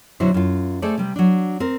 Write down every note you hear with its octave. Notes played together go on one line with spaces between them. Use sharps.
B2 D3 F#3 E4 C5
F#2 F4
A3 G#4 A4 C5 D5
C3 G3
F#3 D4
C4 A#4